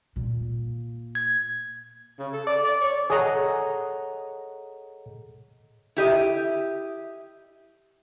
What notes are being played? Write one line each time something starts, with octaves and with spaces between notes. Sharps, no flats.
A#2
G#6
C#3
A4
D5
D5
C#5
G#4 A4 C#5 D#5 F#5 A#5
E4 G4 D#5